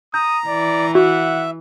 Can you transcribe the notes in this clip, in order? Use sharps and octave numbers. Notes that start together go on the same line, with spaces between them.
A#5 D#6 G6
E3 D5
F#4 E5 F#5